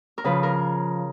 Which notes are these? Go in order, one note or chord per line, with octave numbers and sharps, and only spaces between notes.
A#4
C#3 F3 B4
A#4